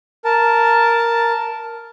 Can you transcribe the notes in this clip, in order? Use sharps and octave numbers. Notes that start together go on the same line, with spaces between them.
A#4 A5